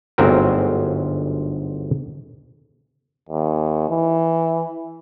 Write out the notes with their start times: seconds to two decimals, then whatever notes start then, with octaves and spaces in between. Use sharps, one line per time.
0.18 G1 D2 G#2 F#3 C4 A#4
3.29 D#2
3.89 E3